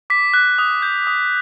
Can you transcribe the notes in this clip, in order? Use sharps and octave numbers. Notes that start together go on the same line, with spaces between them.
D6 B6
F#6
D#6
G6
D#6